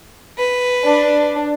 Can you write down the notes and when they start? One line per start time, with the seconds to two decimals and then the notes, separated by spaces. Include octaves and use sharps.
0.38 B4
0.84 D4